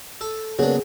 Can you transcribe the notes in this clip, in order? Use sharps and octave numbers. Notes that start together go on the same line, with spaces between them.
A4
C#3 F#3 A#3 B3 D4 G#4